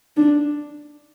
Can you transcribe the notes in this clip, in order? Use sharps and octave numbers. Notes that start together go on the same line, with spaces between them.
D4